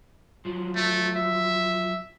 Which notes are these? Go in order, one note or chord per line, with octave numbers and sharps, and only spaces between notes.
F3 F#3
A3
E5